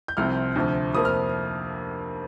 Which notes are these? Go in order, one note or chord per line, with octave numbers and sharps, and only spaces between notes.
G6
C2 C3 F3 C4 F6
D2 C3 F3
F2 C3 F3 A#3 D#6
F6